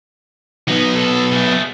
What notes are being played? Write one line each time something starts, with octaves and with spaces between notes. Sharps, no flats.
F#3 B3 D#4
A4
A3 G#4